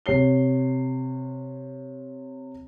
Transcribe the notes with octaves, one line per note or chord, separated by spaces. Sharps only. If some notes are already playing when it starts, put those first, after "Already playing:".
C3 C#5 C7 G7